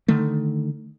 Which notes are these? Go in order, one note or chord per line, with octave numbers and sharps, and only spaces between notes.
D3 D#3 A3